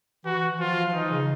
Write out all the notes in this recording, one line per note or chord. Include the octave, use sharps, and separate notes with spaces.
E3 F#4
E3
F3 F4
F3
E3 D#4
C#3